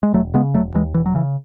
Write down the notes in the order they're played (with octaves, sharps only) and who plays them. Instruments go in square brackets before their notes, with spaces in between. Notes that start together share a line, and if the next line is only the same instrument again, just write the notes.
[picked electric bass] G#3
E1 F#3 A3
C#3 G#3 B3
E1 F#3 A3
D#2 E3 G#3
E1 E3
F#3
C#3 E3